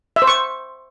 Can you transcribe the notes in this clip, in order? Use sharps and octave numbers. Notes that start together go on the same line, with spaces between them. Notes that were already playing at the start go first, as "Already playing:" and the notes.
E5
C5
C#6